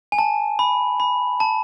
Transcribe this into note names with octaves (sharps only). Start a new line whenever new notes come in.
G#5
A5
B5
B5
A5